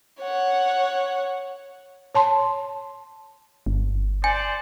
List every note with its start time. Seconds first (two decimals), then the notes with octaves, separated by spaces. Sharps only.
0.20 C#5 F#5
2.15 C#5 A5 C6
3.66 G1
4.24 C5 D5 G#5